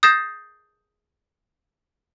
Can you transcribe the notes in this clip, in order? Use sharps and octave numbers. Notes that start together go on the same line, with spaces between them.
D#6 G6 A6 A#6 C7 E7